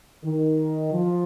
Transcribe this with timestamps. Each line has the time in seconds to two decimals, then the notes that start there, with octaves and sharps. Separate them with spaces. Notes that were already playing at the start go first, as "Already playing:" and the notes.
0.24 D#3
0.93 F3